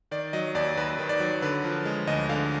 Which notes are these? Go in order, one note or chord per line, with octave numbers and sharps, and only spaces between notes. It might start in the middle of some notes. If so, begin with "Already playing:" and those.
D#3 D5
F#3 D#5
D#2 D5
D#2 B4
D#3
D5
F#3
D3 B4
F3
G#3
D2 D#5
D3 F5